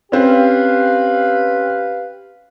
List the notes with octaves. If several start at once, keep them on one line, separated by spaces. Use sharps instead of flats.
C4 C#4 G4 B4 F5